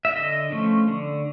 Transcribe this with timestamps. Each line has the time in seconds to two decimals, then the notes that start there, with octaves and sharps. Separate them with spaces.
0.05 E5
0.16 D3 D#5
0.52 F3 A3 C#4
0.88 D3